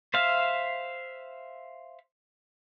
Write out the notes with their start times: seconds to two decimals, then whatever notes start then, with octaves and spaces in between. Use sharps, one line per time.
0.14 C5 E5 F5